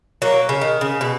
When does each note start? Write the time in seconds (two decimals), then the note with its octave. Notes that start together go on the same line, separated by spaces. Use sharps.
0.22 F#3 A#3
0.49 C#3
0.61 D#3
0.81 C#3
1.01 B2